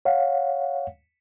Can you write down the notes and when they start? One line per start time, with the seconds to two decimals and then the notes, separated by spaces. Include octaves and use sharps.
0.05 C#5 F5 F#5